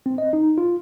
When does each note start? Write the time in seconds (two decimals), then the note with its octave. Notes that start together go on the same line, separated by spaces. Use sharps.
0.06 C4
0.18 D#5
0.33 D#4
0.58 F4